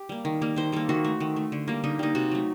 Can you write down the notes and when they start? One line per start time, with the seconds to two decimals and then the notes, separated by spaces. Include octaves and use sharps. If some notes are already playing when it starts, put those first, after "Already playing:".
Already playing: G4
0.09 G3 A#3
0.25 D#3
0.42 G3 A#3
0.56 D#3 C5
0.72 G3 A#3 A4
0.89 D#3 F#4
1.05 A3
1.20 D#3
1.36 A3
1.52 D3
1.68 G3 A#3
1.84 D3 D#4
1.99 G3 A#3 D#4
2.15 C3 F#4
2.31 F#3 A3